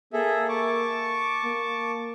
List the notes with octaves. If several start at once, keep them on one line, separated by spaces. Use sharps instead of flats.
A#3 G#4 A4 E5
A5 C#6 D6
A#3